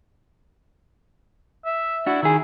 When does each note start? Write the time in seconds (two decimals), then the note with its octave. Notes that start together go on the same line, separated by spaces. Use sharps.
1.65 E5
2.06 D4 E4 F#4
2.23 D#3 E4 G#4